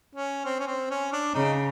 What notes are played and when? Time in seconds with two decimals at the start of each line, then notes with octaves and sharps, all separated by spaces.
0.15 C#4
0.45 C4
0.59 C#4
0.67 C4
0.91 C#4
1.13 D4
1.35 C#3 D#4